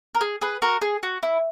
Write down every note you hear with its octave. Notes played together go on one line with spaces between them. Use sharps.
A#4
G#4
G#4 B4
F#4 A#4
G#4
F#4
E4